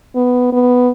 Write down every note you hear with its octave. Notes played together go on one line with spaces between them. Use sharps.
B3
B3